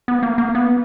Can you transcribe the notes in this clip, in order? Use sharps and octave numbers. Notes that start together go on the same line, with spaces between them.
B3
A#3
A#3
B3